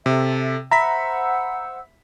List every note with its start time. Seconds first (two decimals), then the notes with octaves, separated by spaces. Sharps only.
0.06 C3 A4 E5
0.72 C5 E5 F#5 A#5 B5 E6 B6